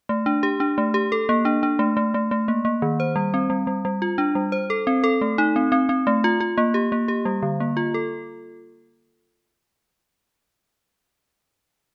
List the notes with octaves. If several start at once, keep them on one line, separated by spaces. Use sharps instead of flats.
A3
D4
G4
D4
A3
G4
A4
A#3
D4
D4
A3
A3
A3
A3
A#3
A#3
D#3
C5
G3
C4
G3
G3
G3
F4
D4
G3
C5
A4
C4
A4
A3
D#4
C4
C4
C4
A3
F4
F4
A#3
G4
A#3
G4
G3
D3
A#3
F4
A4